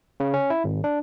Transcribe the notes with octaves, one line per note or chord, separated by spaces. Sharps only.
C#3
C#4
E4
G#1
D4